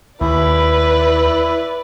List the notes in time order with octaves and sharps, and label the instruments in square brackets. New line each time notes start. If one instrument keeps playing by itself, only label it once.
[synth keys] D#2 [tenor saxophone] E4 [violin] B4 D5